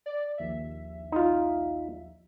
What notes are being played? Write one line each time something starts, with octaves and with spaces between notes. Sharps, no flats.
D5
A#1 D#2 E5
D#4 F4